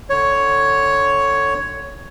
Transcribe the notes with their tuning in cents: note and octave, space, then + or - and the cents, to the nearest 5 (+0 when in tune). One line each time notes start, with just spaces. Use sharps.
D3 +10 C#5 +5